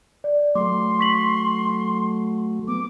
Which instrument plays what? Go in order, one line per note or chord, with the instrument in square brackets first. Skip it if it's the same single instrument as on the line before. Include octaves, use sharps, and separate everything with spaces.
[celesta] D5
[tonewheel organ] F#3 A3 [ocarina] C6 [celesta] D6
[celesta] C#6 B6 F#7
[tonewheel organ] B3 [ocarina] D6